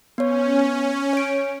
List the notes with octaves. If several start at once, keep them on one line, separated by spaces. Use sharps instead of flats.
B3 C#4 C#5
C#5 D7